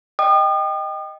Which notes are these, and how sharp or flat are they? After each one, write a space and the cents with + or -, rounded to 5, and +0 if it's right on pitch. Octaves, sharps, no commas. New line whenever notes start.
D#5 +0 G5 +0 D#6 -40